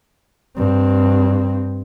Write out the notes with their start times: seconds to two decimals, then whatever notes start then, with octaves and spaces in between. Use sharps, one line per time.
0.57 G2 C4